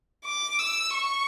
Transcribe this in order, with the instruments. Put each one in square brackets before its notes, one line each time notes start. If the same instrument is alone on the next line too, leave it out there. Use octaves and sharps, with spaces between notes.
[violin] D6
E6
C#6